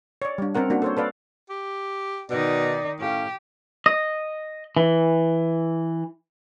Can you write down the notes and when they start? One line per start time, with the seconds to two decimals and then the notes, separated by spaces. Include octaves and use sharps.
0.22 C#5 D5
0.38 G3 D4
0.55 C4 C#4 A#4 F#5
0.70 A#3 D4 F#4
0.82 A4 C5 C#5
0.97 A4 B4 D5 F5
1.50 G4
2.30 B2 D#3 D#4 D5
3.00 A2 C#4 G4 F5
3.86 D#5
4.77 E3